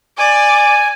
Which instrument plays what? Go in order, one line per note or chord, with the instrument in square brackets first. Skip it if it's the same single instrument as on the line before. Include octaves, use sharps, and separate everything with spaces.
[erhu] D5 [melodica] G#5